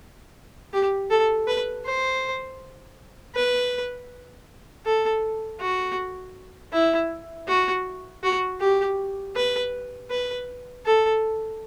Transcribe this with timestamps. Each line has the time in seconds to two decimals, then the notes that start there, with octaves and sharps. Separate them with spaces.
0.73 G4
1.11 A4
1.48 B4
1.86 C5
3.35 B4
4.85 A4
5.60 F#4
6.73 E4
7.48 F#4
8.23 F#4
8.60 G4
9.36 B4
10.11 B4
10.86 A4